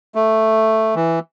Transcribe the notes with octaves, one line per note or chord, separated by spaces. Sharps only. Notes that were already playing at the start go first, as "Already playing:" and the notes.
A3
E3